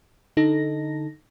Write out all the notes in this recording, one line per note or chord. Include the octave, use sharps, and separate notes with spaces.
D3 D#4 A4 A#6